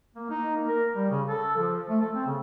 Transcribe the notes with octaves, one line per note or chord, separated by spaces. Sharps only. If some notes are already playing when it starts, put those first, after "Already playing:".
A#3
D#4
A#3
A#4
G3
C#3
A4
F3
A3
A4
C4
C#3